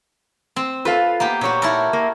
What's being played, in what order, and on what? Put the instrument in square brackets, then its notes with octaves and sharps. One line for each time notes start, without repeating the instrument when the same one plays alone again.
[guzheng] C4
[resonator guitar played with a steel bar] F4 A4 F5 [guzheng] B4
[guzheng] A#3 B3 G4
[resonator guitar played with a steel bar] A#2 C#5 [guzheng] F#4 G4
[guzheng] E4 A4 A#4
[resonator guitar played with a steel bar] A#3